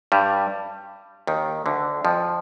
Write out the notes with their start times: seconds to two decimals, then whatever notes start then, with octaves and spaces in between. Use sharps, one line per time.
0.12 G2 G3
1.27 D#2 D#3
1.66 D2 D3
2.05 F2 F3